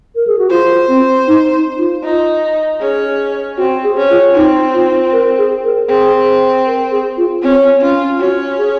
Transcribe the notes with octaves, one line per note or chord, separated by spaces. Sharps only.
A#4
G#4
F#4
F4 C5
C4
D#4
D#4
F4
D#4
C#4 G#4
C4 F#4
G#4
C#4
F4
C4 D#4
F4
A#4
G#4
A#4
C4 G#4
A#4
G#4
F4
C4 C#4
C#4 F4
C#4 F#4
G#4